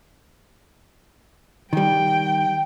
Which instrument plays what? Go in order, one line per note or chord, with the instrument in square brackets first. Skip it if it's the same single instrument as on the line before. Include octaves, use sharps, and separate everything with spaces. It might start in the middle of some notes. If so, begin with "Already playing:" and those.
[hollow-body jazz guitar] D#3 G3 [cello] G5